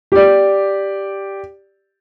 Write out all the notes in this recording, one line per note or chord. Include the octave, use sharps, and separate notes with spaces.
G4 D5